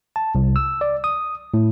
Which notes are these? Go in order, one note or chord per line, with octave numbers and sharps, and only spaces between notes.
A5
C2
E6
D5
D#6
A2